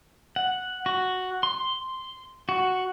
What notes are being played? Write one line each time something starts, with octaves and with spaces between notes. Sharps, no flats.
F#5
F#4
C6
F#4